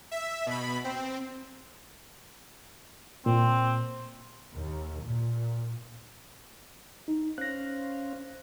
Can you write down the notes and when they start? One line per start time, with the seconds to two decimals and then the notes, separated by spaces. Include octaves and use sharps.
0.11 E5
0.46 B2 B5
0.84 C4
3.26 A#2 C4
4.55 D#2
5.03 A#2
7.08 D#4
7.38 C#4 C5 F5 F#6 A#6